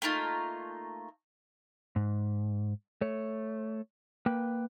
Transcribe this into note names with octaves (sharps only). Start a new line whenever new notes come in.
A3 A#3 D#4 F4
G#2
A3 C#5
A#3 B4 G5